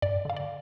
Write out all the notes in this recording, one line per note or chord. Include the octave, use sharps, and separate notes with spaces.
G2 D5
D3 F5
D5